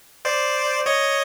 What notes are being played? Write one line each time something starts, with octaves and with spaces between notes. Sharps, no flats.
C5 D5
C#5 D#5